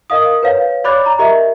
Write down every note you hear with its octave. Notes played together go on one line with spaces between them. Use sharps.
A#4 D#5 F5 D#6
B4 C#5 F5
C#5 D5 B5 D6 F#6 A6
A#5
G4 A#4 D#5 E5